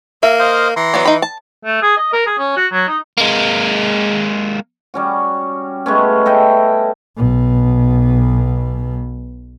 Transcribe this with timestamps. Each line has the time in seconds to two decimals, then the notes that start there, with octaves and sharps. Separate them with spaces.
0.23 A#3 E5
0.39 C5 D#5 F5
0.76 E3 A#5 C6
0.94 F#3 B3 D5
1.05 D#4 B5
1.22 A5
1.65 A3
1.82 G#4
1.97 D#5
2.13 A#4
2.27 G#4
2.38 C#4
2.57 F#4
2.72 F#3
2.88 D#4
3.18 G#3 A#3
4.94 G3 C#4 F#4
5.86 G#3 A3 B3 C#4
6.26 A4 D#5 E5 G5
7.17 B1 B2